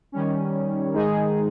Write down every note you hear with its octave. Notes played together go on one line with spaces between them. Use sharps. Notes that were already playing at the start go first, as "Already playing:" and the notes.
D#3 G3 C#4
G#2 D#3 G#3 D#4 G#4